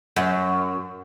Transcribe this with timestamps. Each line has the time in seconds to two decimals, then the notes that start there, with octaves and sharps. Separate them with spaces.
0.16 F#2